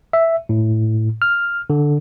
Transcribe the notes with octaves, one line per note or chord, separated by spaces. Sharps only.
E5
A2
F6
D3